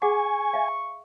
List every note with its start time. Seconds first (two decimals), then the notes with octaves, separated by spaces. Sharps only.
0.02 G#4 F#5 G#5 C#6
0.54 E5 F5